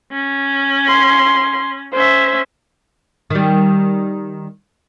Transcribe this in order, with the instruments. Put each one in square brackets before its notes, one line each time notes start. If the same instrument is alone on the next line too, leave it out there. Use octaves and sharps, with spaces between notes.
[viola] C#4
[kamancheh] C6
[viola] C#4 E5 [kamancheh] C5
[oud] D#3 G3